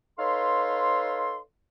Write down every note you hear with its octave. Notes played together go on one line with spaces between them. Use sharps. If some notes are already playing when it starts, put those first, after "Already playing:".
D#4 A4 B4 C#5 F5 C6